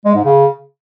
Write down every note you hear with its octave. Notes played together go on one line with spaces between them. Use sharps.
G#3
G#2
C#3